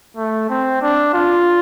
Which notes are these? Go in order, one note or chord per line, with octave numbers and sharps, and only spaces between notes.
A3
C4
D4
F4